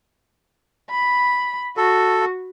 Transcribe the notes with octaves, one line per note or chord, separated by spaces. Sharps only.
B5
F#4 A4